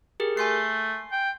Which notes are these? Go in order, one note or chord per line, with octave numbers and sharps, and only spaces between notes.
G4 G#4 A#4
A3 G#5 C6 C7
G5